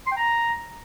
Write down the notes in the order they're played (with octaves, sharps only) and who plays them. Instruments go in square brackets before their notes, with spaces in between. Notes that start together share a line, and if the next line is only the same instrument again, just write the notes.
[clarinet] C6
G5
A#5